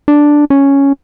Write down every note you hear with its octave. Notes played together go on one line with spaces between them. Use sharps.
D4
C#4